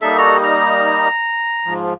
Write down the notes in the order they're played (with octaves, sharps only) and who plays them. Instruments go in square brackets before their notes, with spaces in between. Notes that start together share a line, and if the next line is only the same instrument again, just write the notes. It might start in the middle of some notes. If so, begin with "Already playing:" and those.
[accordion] G3 A#3 D#4 [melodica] A4 E5
[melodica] F#4 A4 A#5
A#5
[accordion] G#2 F3